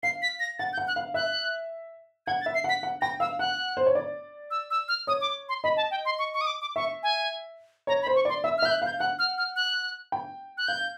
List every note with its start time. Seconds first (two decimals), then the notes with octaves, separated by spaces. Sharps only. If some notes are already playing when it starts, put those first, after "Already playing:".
0.03 F5 C7
0.22 B6
0.40 A#6
0.59 F#5 A6
0.73 G6
0.77 F#5
0.88 F#6
0.96 F5
1.14 E5 F#6
2.27 F#5 G#6
2.41 A6
2.46 E5
2.55 C7
2.64 F#5 B6
2.83 F#5
3.01 G5 A#6
3.20 F5 E6
3.39 F#5 F#6
3.77 C5
3.86 C#5
3.95 D5
4.51 E6
4.71 E6
4.88 F6
5.07 C#5 D#6
5.21 D6
5.49 C6
5.64 D#5 B5
5.77 A5
5.91 G5
6.05 C6
6.19 C#6
6.34 C#6
6.41 D#6
6.47 D6
6.61 D6
6.76 E5 C#6
7.03 G#5
7.87 C#5 A#5
8.02 B5
8.07 C5
8.16 C#6
8.25 D5 C6
8.44 E5 E6
8.58 F6
8.62 E5 G6
8.71 F#6
8.82 F5 G6
8.99 F#5 F#6
9.19 F6
9.38 F6
9.56 F#6
10.12 G5
10.58 F#6
10.68 F5 G6